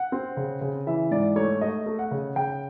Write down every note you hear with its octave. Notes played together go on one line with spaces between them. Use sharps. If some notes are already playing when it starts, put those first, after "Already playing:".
Already playing: F#5
C4
C#3
C#3
E3 E5
G#2 D5
A3 C#5
A3 D#5
A3
F#5
C#3
C#3 G5